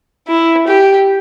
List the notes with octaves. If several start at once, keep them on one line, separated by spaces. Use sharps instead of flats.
E4
G4